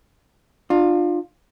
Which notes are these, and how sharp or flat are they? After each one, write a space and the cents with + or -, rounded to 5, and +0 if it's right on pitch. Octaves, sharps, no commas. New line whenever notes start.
D4 +40 F4 +15